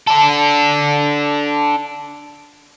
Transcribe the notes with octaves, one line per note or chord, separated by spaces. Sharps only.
D4 A4